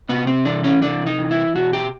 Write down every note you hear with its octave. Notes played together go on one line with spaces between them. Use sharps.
C3 B3
C4
E3 D4
C#4
C3 D4
D#4
E3
E4
B2 F#4
G4